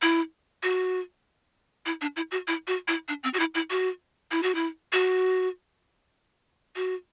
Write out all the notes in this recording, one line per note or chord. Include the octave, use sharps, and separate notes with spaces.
E4
F#4
E4
D4
E4
F#4
E4
F#4
E4
D4
C4
F#4
E4
E4
F#4
E4
F#4
E4
F#4
F#4